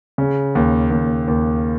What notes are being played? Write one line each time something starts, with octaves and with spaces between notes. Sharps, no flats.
C#3
D#2
D#2
D#2